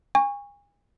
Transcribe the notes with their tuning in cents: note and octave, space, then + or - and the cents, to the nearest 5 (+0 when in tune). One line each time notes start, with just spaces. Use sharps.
G#5 -35 C#6 +0